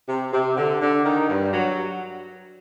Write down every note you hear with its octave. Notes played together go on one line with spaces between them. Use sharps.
C3
C3
D3
D3
D#3
G2
F#3